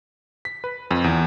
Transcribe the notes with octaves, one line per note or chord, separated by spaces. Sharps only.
B6
B4
F2
E2